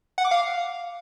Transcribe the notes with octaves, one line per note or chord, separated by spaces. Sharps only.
F#5
D6
F5